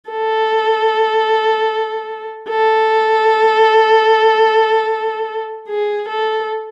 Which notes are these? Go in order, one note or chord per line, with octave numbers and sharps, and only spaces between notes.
A4
A4
G#4
A4